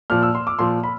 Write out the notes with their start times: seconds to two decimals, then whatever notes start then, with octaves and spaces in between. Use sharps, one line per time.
0.10 A#2 F3 F6
0.23 E6
0.35 C6
0.47 D6
0.59 A#2 F3 C6
0.84 B5